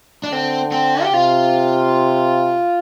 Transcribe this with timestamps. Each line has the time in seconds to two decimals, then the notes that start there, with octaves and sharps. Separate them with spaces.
0.24 D4
0.32 D3 C4
0.72 C4
1.03 G4
1.13 C3 F4